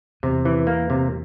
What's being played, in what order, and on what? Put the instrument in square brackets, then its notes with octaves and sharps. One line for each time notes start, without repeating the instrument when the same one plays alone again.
[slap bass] E2 [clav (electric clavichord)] C3
[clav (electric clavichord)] E3
A#3
C3